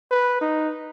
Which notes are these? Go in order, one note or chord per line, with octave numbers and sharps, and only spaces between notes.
B4
D#4